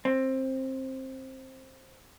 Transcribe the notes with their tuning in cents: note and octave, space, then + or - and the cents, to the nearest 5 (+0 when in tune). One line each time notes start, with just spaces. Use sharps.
C4 +15